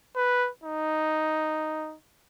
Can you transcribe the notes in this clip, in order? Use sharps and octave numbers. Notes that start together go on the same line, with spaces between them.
B4
D#4